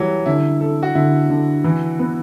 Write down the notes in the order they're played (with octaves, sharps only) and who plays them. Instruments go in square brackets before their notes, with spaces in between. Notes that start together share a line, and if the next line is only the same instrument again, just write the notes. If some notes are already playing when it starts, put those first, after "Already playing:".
Already playing: [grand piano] E3 F#3 [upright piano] G3
[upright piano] D3 [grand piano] E4
[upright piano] A4
[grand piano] F#4
[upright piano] D3 [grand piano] E4
[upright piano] D3
E3
B3